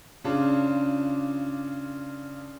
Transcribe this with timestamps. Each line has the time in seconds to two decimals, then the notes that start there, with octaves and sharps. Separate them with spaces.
0.24 C#3 D4 F4